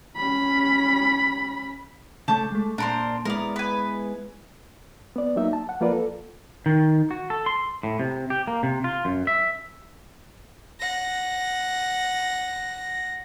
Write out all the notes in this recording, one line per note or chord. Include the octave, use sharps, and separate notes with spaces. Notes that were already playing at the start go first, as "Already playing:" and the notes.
C#4 B5
C#3 A3 A4 A5 D6 G6
G#3 A3
A#2 D4 A#4 C5
G#3 B3 E4 A#4 D5
B4 G#5
B3 D5
F#3 A#3 D#4 E5
A5
F#5
F3 A#3 F4 A#4 B4 D5
A4
D#3
F#4
A4
C6
A2
C3
G4
A#3
C3
F4
F#2
E5
F#5 A#6